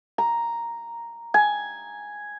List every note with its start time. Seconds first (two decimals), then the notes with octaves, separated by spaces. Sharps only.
0.18 A#5
1.34 G#5